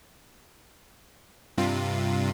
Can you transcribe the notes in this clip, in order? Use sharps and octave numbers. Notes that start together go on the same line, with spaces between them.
G2 C3 F4